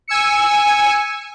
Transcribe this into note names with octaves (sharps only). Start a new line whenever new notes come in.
G#5 E6 C#7